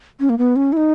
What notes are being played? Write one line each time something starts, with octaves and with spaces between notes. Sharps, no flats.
C#4
A#3
B3
C#4
E4
D#4